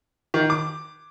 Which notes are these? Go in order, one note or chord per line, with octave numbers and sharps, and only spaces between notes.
D#3
D6